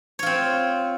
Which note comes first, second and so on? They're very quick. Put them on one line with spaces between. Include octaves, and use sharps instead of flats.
C#5 F4 C4